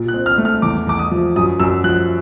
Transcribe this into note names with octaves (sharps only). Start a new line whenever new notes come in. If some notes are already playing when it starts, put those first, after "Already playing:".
Already playing: A#2
F#6
C4
F6
A3
F6
E2 D6
E2 D6
D#6
F3
F#2 D#6
F#2 E6
F3 F#6